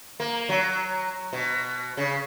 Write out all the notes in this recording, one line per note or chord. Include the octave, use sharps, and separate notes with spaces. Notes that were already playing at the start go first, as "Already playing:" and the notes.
A#3
F#3
B2
C#3